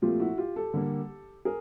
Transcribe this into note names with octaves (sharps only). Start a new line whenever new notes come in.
A#2 F3 A3 C4 F4 G4
E4 F#4
F4 G4
G4 A4
D3 G3 A#3
G#4 A#4